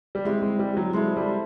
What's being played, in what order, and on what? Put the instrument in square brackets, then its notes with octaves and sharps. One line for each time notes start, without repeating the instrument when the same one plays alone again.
[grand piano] G3
[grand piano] G#3 [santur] C4 E4 G4
[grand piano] G#3
G3
F#3
[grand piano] G#3 [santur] E4 A4 C5
[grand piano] G3